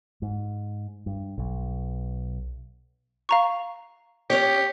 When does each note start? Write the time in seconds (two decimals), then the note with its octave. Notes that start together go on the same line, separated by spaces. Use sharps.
0.22 G#2
1.06 G2
1.38 B1
3.29 F5 A#5 C#6
4.30 C#4 G4 C#5